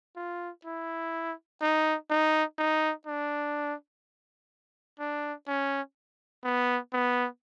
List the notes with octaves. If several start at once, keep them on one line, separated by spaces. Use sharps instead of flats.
F4
E4
D#4
D#4
D#4
D4
D4
C#4
B3
B3